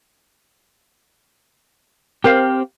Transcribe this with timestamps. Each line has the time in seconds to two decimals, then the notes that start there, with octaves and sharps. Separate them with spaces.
2.24 C4 G4 A#4 C5 F5